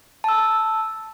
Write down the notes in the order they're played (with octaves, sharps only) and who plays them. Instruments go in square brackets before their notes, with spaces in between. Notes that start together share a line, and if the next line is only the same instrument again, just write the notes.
[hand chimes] A5 E6